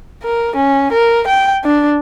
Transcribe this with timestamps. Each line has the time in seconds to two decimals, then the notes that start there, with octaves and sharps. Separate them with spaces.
0.23 A#4
0.56 C#4
0.92 A#4
1.27 G5
1.65 D4